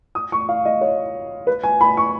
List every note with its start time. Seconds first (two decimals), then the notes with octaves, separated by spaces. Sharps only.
0.15 D#6
0.32 C#6
0.49 F5
0.65 D#5
0.81 C#5
1.47 B4
1.63 G#5
1.81 B5
1.97 C#6